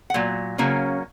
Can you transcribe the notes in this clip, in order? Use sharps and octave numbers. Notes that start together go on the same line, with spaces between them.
F#5
A#2 F#3
C#3 F#3 A#3 C#4